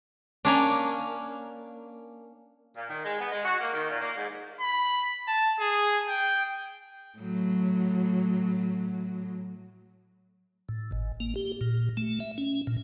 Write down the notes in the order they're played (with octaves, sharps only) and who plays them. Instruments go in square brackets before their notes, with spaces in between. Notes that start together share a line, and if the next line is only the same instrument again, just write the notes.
[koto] A#3 C#4 D4
[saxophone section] A#2
D#3
G#3
B3
G#3
F#4
A#3
D#3
A#2
A#3
G#2
[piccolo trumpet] B5
A5
G#4
G5
[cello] A2 F#3
[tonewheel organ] A2
G#1
A#3
G4
A#2
A3
E5
C#4
A#2